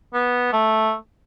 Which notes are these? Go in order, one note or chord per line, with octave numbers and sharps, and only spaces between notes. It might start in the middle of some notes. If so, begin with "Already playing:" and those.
B3
A3